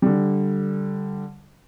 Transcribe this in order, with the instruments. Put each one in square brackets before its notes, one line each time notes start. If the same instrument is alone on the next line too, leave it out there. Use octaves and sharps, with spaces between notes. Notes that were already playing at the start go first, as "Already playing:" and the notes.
[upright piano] D3 G3